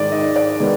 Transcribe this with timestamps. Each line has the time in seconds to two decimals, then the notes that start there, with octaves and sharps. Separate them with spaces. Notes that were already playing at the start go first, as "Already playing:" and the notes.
Already playing: G#2 D#3 G#3 D5
0.12 D#5
0.36 D5
0.60 D#3 G#3 B3